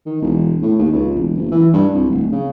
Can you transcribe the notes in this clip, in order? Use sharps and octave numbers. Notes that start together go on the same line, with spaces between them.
D#3
E1
A2
D#2
C#2
E1
F#1
E3
G2
C2
D1
C#3